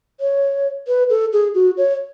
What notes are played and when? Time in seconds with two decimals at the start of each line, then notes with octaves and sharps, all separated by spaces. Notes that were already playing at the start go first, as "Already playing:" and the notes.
0.20 C#5
0.88 B4
1.10 A4
1.33 G#4
1.55 F#4
1.77 C#5